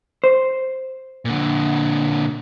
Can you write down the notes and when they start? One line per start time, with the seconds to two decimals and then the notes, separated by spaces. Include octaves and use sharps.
0.24 C5
1.25 A#2 D3